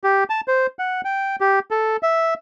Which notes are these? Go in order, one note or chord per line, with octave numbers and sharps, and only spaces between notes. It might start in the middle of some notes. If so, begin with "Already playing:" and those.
G4
A5
C5
F#5
G5
G4
A4
E5